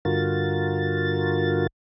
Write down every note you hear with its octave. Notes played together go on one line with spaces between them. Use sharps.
G2 D3 F4 F#4 A#4 A6